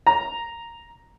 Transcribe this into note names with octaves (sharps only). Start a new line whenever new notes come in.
A#5